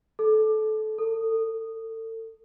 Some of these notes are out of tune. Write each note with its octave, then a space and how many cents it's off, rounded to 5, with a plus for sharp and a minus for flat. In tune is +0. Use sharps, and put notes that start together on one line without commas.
A4 -20
A4 +30